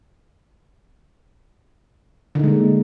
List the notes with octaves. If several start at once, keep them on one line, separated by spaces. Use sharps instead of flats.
D3 G#3 A#3 D#4